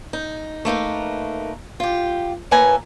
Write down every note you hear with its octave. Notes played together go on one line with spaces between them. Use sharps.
D#4
A3 A#3 D#4 B4
F4 G4
A2 A#3 A4 B4 G#5 A#5